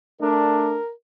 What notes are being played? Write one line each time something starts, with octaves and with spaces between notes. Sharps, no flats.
A3 D4 A#4